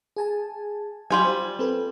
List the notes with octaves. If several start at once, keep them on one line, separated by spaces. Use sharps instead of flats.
G#4 G#5 A5
F#3 G3 F4 G4 G#5
C5
C4 A4 B4